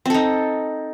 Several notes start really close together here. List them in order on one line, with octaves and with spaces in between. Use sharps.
C4 A4 D#4